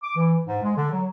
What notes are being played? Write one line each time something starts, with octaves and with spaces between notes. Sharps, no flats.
D6
E3
G#2
G#3
D3
F#3